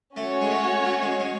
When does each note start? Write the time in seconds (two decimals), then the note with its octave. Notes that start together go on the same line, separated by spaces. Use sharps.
0.16 A3 C#4 F#4 C#5
0.41 G#3
0.51 A3
0.85 A3
1.02 G#3
1.20 G#3